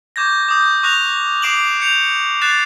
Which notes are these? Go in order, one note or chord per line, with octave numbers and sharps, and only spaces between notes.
C#6 D6 G6 G#6 A#6
D6 D#6 G6
C#6 D#6 F#6 A#6 F7
D6 C7 D7 E7 F#7
G6 C#7 F7
F#6 A6 C7 E7